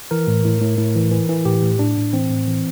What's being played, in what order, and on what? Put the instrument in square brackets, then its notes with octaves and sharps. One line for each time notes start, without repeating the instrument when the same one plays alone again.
[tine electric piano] E3 A#4
A2
A2
A2
A2
E3
E3
E3
A2 G4
A2
A2 D4
A2
E3 C4
A2
E3